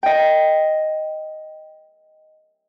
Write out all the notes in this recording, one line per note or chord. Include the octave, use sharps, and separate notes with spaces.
D#5 G5